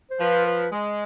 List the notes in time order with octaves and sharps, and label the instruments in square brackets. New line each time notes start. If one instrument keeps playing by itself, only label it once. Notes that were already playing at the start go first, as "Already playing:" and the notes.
[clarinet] C5
[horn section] F3 [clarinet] B4
[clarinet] B4
[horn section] G#3